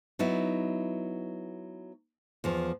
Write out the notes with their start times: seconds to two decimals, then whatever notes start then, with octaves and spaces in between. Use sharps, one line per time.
0.19 F#3 B3 D#4 E4
2.44 E2 F3